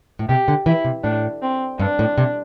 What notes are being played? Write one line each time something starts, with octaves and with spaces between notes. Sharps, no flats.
A2
C3 G4
D3
E3 E4
C3
A2 D4
C4
G2 D4
A2
C3